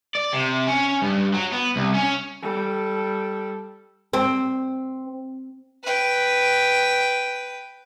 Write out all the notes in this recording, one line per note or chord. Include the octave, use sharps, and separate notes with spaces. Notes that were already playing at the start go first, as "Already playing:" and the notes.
D5
C3
C#4
G2
F#3
B3
C2
C#4
G3 A4
C4
B4 G5